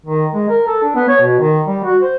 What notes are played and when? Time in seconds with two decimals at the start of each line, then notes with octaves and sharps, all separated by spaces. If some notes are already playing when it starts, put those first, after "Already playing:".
0.06 D#3
0.34 G#3
0.49 A#4
0.67 A4
0.83 D4
0.95 B3
1.08 C#5
1.20 B2
1.39 D#3
1.67 G3
1.84 F#4
2.02 C5